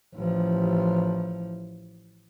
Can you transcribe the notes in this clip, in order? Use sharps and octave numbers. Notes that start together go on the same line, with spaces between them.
A1 F3